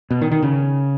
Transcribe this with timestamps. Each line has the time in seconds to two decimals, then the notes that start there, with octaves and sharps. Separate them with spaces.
0.11 B2
0.22 D#3
0.32 D#3
0.42 C#3